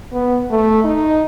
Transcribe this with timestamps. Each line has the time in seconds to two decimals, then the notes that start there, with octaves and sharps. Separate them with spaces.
0.13 B3
0.50 A3
0.84 D#4